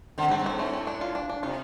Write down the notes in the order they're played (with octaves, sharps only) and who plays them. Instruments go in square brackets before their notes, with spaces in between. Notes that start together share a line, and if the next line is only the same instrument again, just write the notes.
[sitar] D3 [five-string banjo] C4
[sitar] G2
[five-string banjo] C4
[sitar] G2
[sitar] A2 [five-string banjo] C4
[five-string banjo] A3
A3
D4
F4
D4
D4
[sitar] C3 [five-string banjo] F4